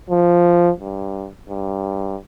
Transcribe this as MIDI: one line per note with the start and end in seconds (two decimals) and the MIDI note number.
0.10 0.71 53
0.80 1.28 43
1.49 2.16 43